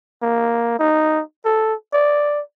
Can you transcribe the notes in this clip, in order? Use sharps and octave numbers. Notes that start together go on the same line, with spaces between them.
A#3
D#4
A4
D5